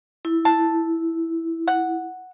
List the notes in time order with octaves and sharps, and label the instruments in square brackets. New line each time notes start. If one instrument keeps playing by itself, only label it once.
[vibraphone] E4
[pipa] A5
F#5